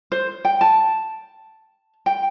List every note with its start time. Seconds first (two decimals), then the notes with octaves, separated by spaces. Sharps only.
0.12 C5
0.45 G5
0.61 A5
2.06 G5